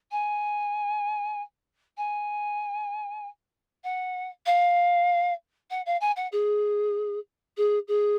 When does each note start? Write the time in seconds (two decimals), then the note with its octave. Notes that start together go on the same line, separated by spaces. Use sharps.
0.11 G#5
1.97 G#5
3.84 F#5
4.46 F5
5.70 F#5
5.86 F5
6.00 G#5
6.16 F#5
6.32 G#4
7.57 G#4
7.88 G#4